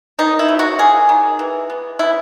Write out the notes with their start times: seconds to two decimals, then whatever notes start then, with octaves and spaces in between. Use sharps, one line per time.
0.19 D#3 D#4
0.39 E4
0.48 F#3
0.59 F#4
0.79 A#3 G#4
1.09 D#3
1.39 E3
1.70 B3
1.99 B3 E4